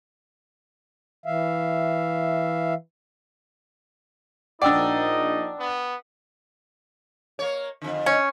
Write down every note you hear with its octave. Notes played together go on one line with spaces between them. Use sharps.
E3 E5 F5
A#1 D4 D#4 D5 D#5 F#5 G5 E6
B3
A#3 C#5
F2 D3
C#4